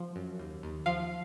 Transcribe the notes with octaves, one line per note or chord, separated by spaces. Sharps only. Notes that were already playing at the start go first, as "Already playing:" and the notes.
Already playing: F3
F#2
D#2
D#2
F3 F5